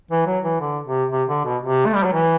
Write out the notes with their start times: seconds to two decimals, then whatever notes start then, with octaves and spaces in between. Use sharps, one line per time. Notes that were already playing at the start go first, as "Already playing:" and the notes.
0.11 E3
0.27 F#3
0.44 E3
0.60 D3
0.87 C3
1.12 C3
1.29 D3
1.45 B2
1.62 C3
1.86 A3
1.95 G3
2.04 F#3
2.13 E3